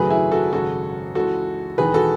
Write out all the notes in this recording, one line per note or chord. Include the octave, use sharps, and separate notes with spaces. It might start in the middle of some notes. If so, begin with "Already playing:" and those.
Already playing: G#1 F#2 C#3 F#3 A3 G#4 B4
E4 G#4
F#4 A4
G#1 F#2 C#3 G#3 F#4 A4
C#2 C#3 E3 G#3 F#4 A4
E1 E2 D#3 G#4 B4
F#4 A4